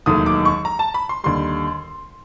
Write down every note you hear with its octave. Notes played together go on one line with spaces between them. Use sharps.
E1 D#2 D#3 F#3 A3 D#6
D6
C#6
A#5
A5
B5
C6
D#2 D3 G3 C6